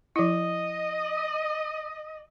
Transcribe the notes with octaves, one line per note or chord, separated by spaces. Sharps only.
F3 E4 D#5